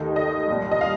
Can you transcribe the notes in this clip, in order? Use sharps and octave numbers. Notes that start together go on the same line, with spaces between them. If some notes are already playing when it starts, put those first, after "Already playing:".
Already playing: D#2 D#3 A3 D#4
D#5
C2 A#2 G3
D#5
F5